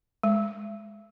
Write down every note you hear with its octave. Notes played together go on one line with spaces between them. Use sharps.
G#3